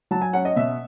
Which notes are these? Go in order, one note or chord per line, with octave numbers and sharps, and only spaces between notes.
F#3 A5
G#5
C#4 F#5
D#5
B2 E5